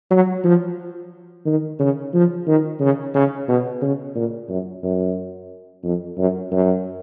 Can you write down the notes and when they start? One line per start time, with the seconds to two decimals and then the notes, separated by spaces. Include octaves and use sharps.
0.11 F#3
0.44 F3
1.46 D#3
1.80 C#3
2.14 F3
2.47 D#3
2.81 C#3
3.15 C#3
3.49 B2
3.82 C#3
4.15 A#2
4.49 F#2
4.83 F#2
5.84 F2
6.18 F#2
6.51 F#2